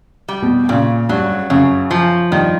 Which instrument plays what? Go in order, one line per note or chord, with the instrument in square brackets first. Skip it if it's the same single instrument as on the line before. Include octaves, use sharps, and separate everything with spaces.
[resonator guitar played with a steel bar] G3
[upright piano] B2
[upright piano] A#2 [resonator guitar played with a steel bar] C#3
[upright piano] G2 [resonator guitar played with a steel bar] F#3
[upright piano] F#2 [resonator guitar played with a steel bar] C#3
[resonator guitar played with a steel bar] F3
[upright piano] G2 [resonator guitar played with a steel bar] D#3